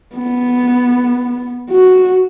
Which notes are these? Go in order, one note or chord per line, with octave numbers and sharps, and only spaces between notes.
B3
F#4